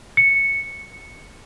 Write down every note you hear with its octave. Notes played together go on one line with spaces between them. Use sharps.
C#7